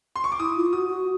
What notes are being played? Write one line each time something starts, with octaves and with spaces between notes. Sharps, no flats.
C6
C#6
D6
E4 D#6
F4
F#4 D#6
F#4